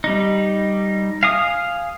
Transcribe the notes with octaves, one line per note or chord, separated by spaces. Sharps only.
G3 D#4
F5 G#5 D#6